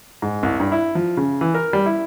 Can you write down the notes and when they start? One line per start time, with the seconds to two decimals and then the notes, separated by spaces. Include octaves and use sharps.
0.22 G#2
0.43 C2
0.60 G2
0.72 E4
0.95 F3
1.17 C#3
1.41 E3
1.55 A#4
1.73 G3
1.86 E4